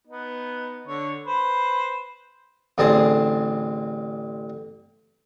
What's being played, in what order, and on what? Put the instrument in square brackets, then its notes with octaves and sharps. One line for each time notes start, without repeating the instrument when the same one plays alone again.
[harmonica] B3 D#4
D3 C#5
B4 C5 B5
[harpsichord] A1 D3 C4 G#4 A5 D#6